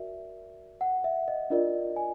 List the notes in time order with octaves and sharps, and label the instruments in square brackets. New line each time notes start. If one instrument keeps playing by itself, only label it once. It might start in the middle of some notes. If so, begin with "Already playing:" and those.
Already playing: [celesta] F#4 A#4 D5 E5
F#5
E5
D#5
D4 F4 A#4 D5 D#5
G#5